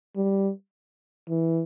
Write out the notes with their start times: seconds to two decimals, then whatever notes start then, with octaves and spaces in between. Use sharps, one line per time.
0.16 G3
1.29 E3